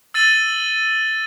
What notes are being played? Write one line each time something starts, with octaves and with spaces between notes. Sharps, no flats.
E6 A6 D#7 F#7 G7